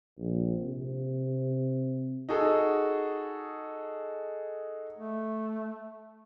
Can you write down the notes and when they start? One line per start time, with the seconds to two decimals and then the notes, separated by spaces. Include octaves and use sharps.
0.19 A#1
0.62 C3
2.29 D#4 F#4 G#4 A4
4.98 A3